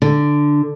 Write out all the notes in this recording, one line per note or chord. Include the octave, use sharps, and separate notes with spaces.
D3